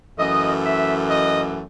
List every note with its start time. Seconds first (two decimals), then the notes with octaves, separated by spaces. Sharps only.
0.19 F#2 E3 A3 D#5
0.64 E5
1.10 D#5